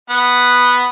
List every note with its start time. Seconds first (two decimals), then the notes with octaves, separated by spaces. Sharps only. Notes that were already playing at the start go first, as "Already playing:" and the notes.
0.10 B3 F#5